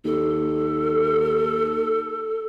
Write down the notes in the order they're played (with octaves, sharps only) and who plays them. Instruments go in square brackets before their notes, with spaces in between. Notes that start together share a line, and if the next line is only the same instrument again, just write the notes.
[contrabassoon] D#2 [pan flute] A4